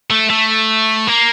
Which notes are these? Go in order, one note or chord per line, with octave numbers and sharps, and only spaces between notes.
A3
A3
A#3